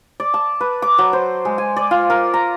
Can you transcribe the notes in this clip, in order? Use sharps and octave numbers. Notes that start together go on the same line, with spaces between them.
D5
A5
B4
D6
F#3
C5
G#3
G#5
D5
F4
A#4
A#5